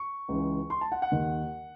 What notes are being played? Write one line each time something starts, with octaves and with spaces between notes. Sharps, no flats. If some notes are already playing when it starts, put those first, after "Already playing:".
Already playing: C#6
C#2 C#3 E3
C6
A5
F#5
F#5
D#2 D#3